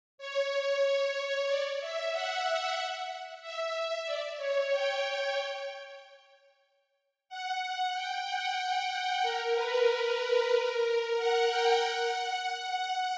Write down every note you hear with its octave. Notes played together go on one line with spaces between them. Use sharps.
C#5
D5
E5
F#5
E5
D5
C#5
G5
F#5
G5
F#5
G5
F#5
A#4
B4
B4
A#4
F#5
G5
F#5
F#5